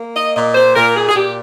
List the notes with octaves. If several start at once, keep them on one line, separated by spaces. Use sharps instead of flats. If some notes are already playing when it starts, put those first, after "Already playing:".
Already playing: A#3
D#5
A#2 D#5
C5
A#2 A#4
G#4
G#4
A#2 G4